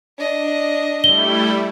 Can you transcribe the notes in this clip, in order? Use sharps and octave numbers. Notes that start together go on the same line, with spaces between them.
D4 D#5
G3 A3 E4 G7